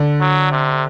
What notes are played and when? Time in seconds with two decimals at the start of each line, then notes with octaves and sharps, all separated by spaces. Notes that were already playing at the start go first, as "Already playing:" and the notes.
Already playing: D3
0.21 F#3
0.52 C3